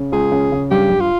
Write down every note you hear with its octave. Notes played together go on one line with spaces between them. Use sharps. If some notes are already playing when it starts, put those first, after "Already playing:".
Already playing: C#3
C#2 G#4
C#3
C#3
G2 G4
G2
F4